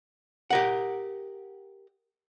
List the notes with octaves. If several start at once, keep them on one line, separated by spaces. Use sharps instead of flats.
G4 A#4 F#5